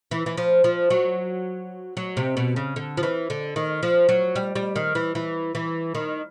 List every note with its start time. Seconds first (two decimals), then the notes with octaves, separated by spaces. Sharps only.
0.11 E3
0.26 E3
0.38 F3
0.64 F3
0.90 F#3
1.97 F#3
2.17 C3
2.37 B2
2.56 C#3
2.76 D3
2.97 F3
3.03 E3
3.30 D3
3.56 D#3
3.83 F3
4.09 F#3
4.36 G3
4.55 G3
4.76 D#3
4.95 E3
5.15 E3
5.55 E3
5.95 D#3